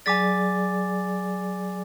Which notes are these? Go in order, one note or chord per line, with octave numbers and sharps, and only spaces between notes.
F#3 G#4 D5 G#5 D6 A6